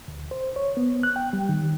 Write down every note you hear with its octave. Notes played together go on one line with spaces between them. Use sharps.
D2
C5
C#5
B3
F#6
G5
G3
D#3